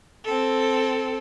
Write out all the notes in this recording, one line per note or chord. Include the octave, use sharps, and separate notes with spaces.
C4 A4